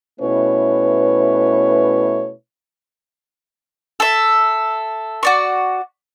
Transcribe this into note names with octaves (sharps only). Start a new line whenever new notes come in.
B2 A3 C#4 E4 B4 C#5
A4 E5
F#4 D5 C#6